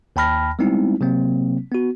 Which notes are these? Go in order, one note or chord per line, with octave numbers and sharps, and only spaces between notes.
D#2 G5 A5 B5 F6 A#6
G3 G#3 B3 C4 D#4 E4
C3 F#3 A#3 C4
B3 F#4